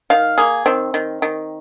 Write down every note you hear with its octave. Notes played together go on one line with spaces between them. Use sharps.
D#3 F5
A#3 G#4
D#3 C4
D#3
D#3